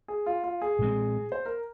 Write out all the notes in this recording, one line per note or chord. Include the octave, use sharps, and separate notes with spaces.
G#4
F4
F4
G#4
A#2 G#3 C4
C5
A#4